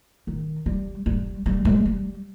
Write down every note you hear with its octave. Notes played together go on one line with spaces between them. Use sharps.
D#3
G3
G3
G3
G#3
G3